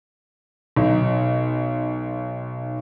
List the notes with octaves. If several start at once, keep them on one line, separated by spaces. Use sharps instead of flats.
B1 D#4